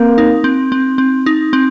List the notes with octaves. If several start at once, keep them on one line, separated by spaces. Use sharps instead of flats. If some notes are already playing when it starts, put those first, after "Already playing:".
Already playing: A#3 C4
D#4
C4
C4
C4
D#4
C4